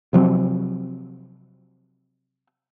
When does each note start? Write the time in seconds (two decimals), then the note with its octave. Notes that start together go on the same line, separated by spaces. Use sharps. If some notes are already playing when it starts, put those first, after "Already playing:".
0.13 C3 F3 F#3 C4